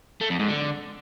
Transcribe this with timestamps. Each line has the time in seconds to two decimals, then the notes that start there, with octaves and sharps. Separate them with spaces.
0.21 A3
0.30 F2
0.39 G#2
0.49 D3